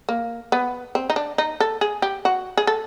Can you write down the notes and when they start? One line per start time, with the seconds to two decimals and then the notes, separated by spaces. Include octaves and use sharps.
0.09 A#3
0.52 B3
0.95 C4
1.10 D#4
1.16 D4
1.38 D#4
1.60 A4
1.81 G#4
2.02 G4
2.25 F#4
2.57 G#4
2.67 A4